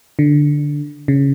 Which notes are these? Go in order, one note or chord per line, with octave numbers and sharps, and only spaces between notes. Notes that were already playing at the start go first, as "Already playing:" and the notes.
D3
C#3